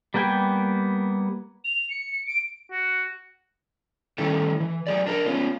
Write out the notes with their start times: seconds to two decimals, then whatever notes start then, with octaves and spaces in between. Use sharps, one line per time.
0.14 G3 A#3 B3 G5 G#5
1.64 F7
1.90 C#7
2.27 D7
2.72 F#4
4.18 D#3 G3 A3 C#4 E4 A4
4.60 E3
4.87 F#3 G#4 D5
5.07 D4 A#4 B4 D5
5.26 B3 C#4 F4